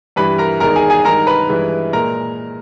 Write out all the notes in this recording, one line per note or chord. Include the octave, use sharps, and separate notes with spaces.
G2 E3 G3 B4 B5
A#4 A#5
E2 D#3 G#3 A#4 A#5
G#4 G#5
G#4 G#5
G2 D#3 G#3 A#4 A#5
B4 B5
G2 E3 G#3
A#2 G#3 A#4 A#5